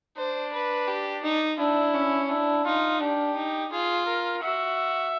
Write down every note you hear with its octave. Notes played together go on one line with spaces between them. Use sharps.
D4 C5
B4
G4
D#4
D4 E4
C#4
D4 E4
D#4 F4
D4 G4
D#4
F4 G#4
A#4
F#4 E5